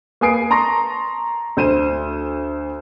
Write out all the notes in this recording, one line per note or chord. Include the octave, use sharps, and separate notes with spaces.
A#3 B4 G#5 D#6 C7 D7
A5 A#5 C6 C#6 A#6
D2 C5 D#7 E7